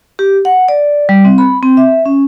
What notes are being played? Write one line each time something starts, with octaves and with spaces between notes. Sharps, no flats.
G4
F#5
D5
G3
C4
B5
C4
E5
C#4